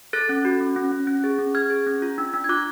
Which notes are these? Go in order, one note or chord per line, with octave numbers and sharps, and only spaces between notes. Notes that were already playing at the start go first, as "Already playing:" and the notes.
A4 F#6 A6
C#4
F#4
C#4
C#4
C#4
C#4
G#4
C#4
G#4 F6 G#6
G#4
C#4
F4
D4
D4
G#6
F4 D6 F#6